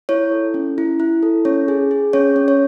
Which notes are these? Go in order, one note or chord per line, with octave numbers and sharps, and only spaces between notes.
E4 C#5
A4
C#4
E4
E4
A4
C#4 C#5
G#4
G#4
C#4 C#5
C#4
C#5